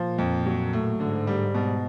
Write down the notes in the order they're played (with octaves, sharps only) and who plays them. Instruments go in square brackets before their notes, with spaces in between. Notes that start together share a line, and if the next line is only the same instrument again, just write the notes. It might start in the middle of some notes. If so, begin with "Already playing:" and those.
Already playing: [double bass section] A#2 [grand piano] F3
[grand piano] F2
F#3
A2
[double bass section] G#2 [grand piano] D3
[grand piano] G3
B2